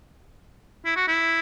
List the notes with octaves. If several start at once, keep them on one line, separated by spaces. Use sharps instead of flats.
E4
F#4
E4